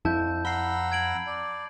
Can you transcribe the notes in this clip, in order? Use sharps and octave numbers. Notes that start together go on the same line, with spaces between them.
F2 E4 A5 G6
F#5 A#5 B5 E6 C7 G7
G#6 D7 F#7
D5